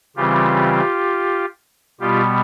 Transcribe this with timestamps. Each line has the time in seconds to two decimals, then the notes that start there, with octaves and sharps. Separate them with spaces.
0.16 C#3 E3 G3 C4 F4 G4
2.00 B2 G3 B3 F4 G4